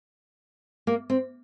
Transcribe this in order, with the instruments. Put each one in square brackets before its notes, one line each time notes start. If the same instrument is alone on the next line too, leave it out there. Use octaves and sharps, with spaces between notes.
[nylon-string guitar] A#3
C4